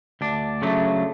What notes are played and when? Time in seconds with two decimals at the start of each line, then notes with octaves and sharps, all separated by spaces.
0.21 D2 D4
0.62 C#3 F#3 A3